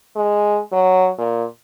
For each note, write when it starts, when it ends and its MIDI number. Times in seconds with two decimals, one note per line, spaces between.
0.16 0.59 56
0.72 1.10 54
1.18 1.45 46